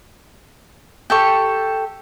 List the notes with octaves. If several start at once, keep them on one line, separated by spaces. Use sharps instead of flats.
G4 A4 C#6